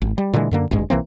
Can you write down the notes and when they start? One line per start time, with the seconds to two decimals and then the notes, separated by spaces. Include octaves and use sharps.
0.02 G#1
0.18 G3
0.34 A#2 D3 E3 G#3
0.51 F#2 D3 A#3
0.71 D1 G#1 G2 G#3
0.90 B1 E3 A#3 C4